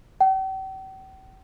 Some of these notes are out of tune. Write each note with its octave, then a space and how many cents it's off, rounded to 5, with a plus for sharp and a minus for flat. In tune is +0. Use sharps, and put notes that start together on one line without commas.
G5 -45